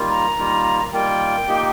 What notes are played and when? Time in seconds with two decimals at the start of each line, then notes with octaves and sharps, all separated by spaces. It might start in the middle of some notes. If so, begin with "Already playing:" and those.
Already playing: D#3 G3 A#3 F4
0.10 A#5
0.37 D#3 G3 A#3 F4
0.93 D#3 G3 A#3 F4 G5
1.48 A#2 A#3 D#4 G4